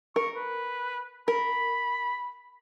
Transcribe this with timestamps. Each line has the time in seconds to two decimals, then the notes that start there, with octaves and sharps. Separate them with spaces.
0.16 A#4 C#6
0.36 B4
1.28 A#4 B5